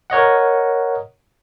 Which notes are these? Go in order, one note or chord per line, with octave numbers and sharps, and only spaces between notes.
A#4 C#5 D#5 F#5